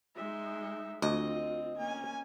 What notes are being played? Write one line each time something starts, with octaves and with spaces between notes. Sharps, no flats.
G#3 D#4 E5 C6
D2 C4 F4 D#5
A#3 C#4 G#5